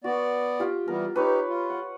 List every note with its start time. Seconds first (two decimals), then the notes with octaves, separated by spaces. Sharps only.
0.04 B3 F#4 D5
0.60 F4 G4
0.88 E3 G3 B3 A#4
1.16 D#4 G4 B4 C#5
1.48 F4
1.70 F#5